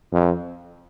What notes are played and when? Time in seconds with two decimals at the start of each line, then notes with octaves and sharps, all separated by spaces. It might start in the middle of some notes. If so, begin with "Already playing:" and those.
0.12 F2